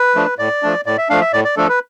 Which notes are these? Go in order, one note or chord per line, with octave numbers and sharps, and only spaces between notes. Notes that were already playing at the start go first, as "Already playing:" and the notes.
Already playing: B4
F3 A3 D4
A2 D5
F3 A3 D4
A2 D5
E5
F3 A3 D4 F5
E5
A2 D5
D5
F3 A3 D4 A4
B4